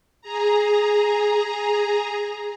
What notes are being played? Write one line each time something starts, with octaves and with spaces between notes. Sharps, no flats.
G#4 A#5